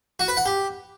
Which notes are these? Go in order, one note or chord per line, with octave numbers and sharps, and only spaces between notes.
F#4
B4
F#5
G4